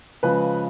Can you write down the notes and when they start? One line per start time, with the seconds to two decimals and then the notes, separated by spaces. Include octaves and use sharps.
0.23 C#3 F3 G#3 B4